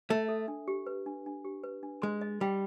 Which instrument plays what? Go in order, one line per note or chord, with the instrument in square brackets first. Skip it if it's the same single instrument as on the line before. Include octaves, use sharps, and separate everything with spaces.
[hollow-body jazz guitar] A3 [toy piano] E5
[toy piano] A4
D4
G4
B4
D4
D4
G4
B4
D4
[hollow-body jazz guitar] G#3 [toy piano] C6
[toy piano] D#5
[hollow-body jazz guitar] G3 [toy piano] G5